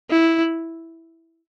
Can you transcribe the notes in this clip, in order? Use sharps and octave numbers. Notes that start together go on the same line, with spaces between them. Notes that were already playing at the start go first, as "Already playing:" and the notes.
E4